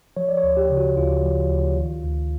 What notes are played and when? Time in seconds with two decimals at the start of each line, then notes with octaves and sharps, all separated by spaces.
0.17 F3 C#5
0.29 D5
0.37 C#5
0.43 D2
0.57 G4
0.70 C#3
0.77 F#4
0.97 D2 F4
1.23 F3
1.49 D2
1.77 D#3
2.04 D2